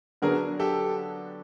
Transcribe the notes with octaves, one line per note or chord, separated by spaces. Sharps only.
D3 F#3 B3 D4 G#4 A#4
G4 A4